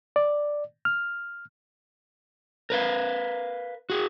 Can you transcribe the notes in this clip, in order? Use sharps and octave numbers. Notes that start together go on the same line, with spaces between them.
D5
F6
A#4 B4 F5
F#4 G#4